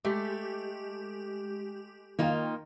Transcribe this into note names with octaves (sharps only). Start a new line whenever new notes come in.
G#3 A3 G4
D#3 A#3 D#4 F4 G5